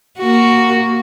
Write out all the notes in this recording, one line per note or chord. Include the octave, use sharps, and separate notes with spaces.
A#3 F#4